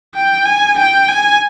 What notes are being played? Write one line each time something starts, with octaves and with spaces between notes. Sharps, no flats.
G5
G#5
G5
G#5